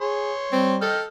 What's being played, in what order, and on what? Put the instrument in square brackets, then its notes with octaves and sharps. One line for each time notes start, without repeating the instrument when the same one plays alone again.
[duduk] G#4 [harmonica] C#5 C6
[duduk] G3 [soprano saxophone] C4
[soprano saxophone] A4 [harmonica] D#5 G5 F6